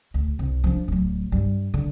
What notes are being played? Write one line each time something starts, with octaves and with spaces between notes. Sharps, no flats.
D2
C2
F3 D4
D1 F#3
G2 G3
D3